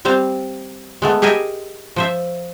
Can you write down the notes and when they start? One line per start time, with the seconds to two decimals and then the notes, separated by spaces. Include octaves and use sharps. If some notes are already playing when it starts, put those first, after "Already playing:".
0.05 G3 C4 C5 F5
1.02 G#3 A3 B3
1.22 G4 G#4 A#4 D#5 E5 G#5
1.96 F3 C5 E5